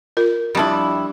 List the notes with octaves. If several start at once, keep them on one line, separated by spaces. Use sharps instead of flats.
F4 A#4
F2 G3 D4 E4